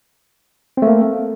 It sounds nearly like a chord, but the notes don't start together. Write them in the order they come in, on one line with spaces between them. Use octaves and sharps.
C4 A3 A#3